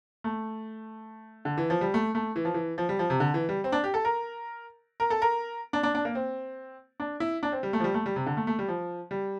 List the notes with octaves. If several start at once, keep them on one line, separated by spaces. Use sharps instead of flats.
A3
D3
E3
F3
G3
A3
A3
E3
F3
E3
F3
G3
F3
C3
D3
E3
G3
C4
D4
G4
A4
A#4
A#4
A4
A#4
D4
D4
D4
A#3
C4
D4
E4
D4
C4
G3
A3
F3
G3
A3
G3
C3
D3
A3
A3
G3
F3
G3